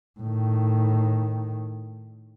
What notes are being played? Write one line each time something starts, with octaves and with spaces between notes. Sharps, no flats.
A2 D#3